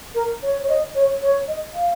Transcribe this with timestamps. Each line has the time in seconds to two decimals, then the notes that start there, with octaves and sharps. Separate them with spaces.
0.15 A#4
0.42 C#5
0.62 C#5
0.69 D#5
0.95 C#5
1.22 C#5
1.48 D#5
1.74 F5